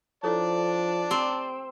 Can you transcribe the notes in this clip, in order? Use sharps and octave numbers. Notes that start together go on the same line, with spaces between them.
F3 E4 A4 C#5 D5 A5
C4 G4 A#5 E6